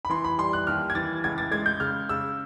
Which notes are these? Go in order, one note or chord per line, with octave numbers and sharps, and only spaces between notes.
B5
E3 C6
B5
G3 C6
F#6
D#2 F6
G#6
E3 A6
C#2 G#6
A6
G#3 G#6
G6
C#3 F6
C#3 E6